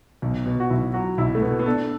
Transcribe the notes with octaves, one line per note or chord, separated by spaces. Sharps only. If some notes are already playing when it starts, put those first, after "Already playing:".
B1
B2
F#4
B1 E4
F#3 F#4
B1 E4
A3
B2 B3
B3
D4 A4